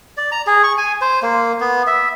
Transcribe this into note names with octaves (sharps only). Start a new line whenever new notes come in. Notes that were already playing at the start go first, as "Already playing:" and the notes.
D5
A#5
G#4
C#6
G#5
C5
A#3
B3
E5